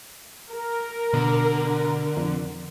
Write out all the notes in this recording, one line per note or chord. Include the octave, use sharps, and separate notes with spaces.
A#4
B2 D3
F2